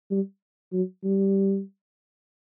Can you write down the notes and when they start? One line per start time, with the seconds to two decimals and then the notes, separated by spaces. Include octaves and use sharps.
0.11 G3
0.73 F#3
1.04 G3